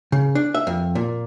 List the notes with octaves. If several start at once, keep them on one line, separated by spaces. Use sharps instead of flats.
C#3
D4
E5
F2
A#2